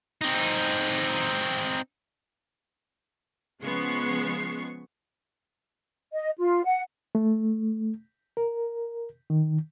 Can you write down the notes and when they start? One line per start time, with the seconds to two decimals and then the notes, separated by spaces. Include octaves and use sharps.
0.22 C4 D#4
3.63 C#3 F3 G#3 B3 C#6 C7
6.12 D#5
6.38 F4
6.65 F#5
7.15 A3
8.37 A#4
9.30 D#3